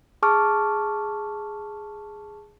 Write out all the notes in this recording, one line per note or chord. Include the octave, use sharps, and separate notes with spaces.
G#4 A5 C#6 D6 F6